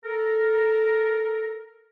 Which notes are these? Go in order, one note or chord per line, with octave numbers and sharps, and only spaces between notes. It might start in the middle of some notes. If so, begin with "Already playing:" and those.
A4 A#4